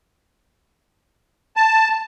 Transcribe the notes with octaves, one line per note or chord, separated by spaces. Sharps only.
A5